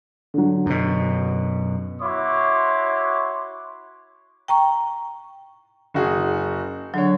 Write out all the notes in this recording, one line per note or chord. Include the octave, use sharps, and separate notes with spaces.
D3 F#3
F#2 B2
E4 F#4 C#5 C6 D6
G5 A#5 C#6
F#1 F#4 G#4
D3 F#3 C#5